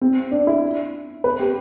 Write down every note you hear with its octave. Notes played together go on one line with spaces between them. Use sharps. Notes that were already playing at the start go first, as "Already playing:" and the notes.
C4
D4
E4
B4
G4